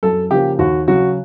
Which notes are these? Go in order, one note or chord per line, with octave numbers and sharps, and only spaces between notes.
F#2 A4
C#3 F3 A#3 G4
D#2 F#4
C#3 F#3 F#4